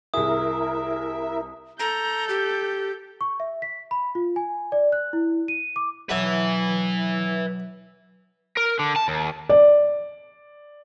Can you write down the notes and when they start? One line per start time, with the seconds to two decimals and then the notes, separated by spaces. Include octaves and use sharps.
0.14 C2 E4 G#4 A#4 E5 D#6
1.80 A4 A#5 G6
2.29 G4
3.21 C#6
3.40 E5
3.62 B6
3.91 B5
4.15 F4
4.36 G#5
4.72 D5
4.92 F#6
5.13 E4
5.48 D#7
5.76 D6
6.10 B1 F#3 B4 E5 A5
8.57 A#4
8.79 D3
8.96 A5
9.08 D#2
9.49 D5